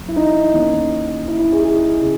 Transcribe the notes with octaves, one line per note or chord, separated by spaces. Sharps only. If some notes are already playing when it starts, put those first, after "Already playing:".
Already playing: D#2 F#3
E4
D#4
D#2 D#3 A#3 C#4
E4
E4
G#4
G#4
C#3